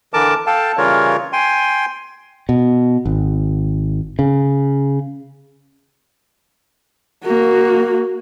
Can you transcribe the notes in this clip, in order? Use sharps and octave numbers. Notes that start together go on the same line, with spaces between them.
D3 E3 A#4 A5 D6
A4 F5 G5 A5
C#3 E3 G3 F4 A#4 C#5
G5 G#5 C6
B2
G#1
C#3
A#3 F#4